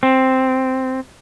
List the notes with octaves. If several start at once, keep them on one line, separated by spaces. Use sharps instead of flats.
C4